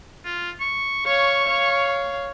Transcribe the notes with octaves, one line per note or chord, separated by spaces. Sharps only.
F4
C#6
C#5 F5 C#6
C#5 F5